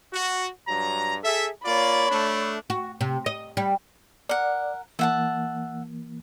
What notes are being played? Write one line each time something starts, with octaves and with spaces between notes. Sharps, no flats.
F#4
G2 F#3 A#5
G#4 A4 E5
A#3 F4 C#5 D5 B5
A3 D4
F#4
C3
D#5
G3
A#4 D5 F#5
E3 A#3 E5 F#5 A5